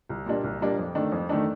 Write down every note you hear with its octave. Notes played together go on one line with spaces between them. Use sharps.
C2
A#2 G3 A#3 D4
C2
A#2 G3 A#3 D4
F2
D#3 A3 D4
F2
D#3 A3 D4